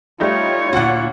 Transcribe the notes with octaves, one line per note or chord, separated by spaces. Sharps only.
G3 A3 D#4 F4 C#5
D2 A#2 F#4 F#5